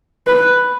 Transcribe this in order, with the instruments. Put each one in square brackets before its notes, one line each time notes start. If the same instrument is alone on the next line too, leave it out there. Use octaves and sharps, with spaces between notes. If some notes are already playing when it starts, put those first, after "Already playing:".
[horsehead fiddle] B4